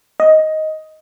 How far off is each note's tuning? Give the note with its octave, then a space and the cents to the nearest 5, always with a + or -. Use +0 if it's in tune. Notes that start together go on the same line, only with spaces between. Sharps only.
D#5 +10